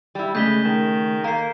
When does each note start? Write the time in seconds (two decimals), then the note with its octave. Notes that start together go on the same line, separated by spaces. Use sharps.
0.15 G3 E4
0.35 C#3 G#3 A3 G6 B6 G7
0.65 D#3
1.24 A#3 A#5 C7